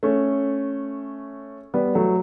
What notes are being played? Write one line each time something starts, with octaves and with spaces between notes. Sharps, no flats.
A3 C#4
G3 B3
F#3 A3